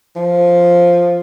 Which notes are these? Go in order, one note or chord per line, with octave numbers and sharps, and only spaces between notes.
F3